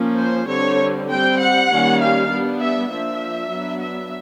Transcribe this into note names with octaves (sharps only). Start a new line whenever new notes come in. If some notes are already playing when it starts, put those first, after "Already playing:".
Already playing: F3 A#3 C#4
C5
D3 G3 C4 C#5
G3 C4 G5
F#5
D#3 G3 A#3 C#4
F5
G3 B3 D4
E5
F3 A#3 D4 E5
F#3 B3 D4
E5